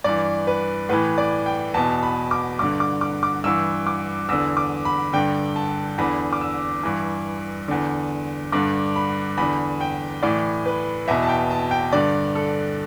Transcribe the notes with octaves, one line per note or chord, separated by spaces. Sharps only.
G2 E3 D5
B4
A2 E3 B4
D5
G5
E2 B2 A5
B5
D6
G2 D3 D6
D6
D6
D6
G2 E3 E6
D6
E2 D3 E6
D6
B5
G2 D3 G5
A5
E2 D3 B5
D6
E6
G2 E3
E2 D3
G2 D3 D6
B5
E2 D3 B5
G5
A2 E3 D5
B4
E2 B2 E5
A5
G5
A5
G5
G2 D3 D5
A4